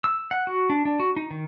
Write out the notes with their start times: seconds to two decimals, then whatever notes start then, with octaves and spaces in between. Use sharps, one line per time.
0.04 E6
0.31 F#5
0.47 F#4
0.70 D4
0.85 D4
1.00 F#4
1.16 D#4
1.31 D#3